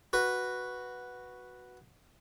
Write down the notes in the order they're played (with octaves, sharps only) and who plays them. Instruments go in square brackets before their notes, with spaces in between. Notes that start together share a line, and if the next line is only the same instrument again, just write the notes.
[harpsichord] F#4 B4